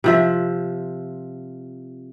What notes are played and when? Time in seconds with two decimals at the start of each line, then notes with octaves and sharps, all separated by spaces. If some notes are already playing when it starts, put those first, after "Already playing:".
0.04 C3 F3 E5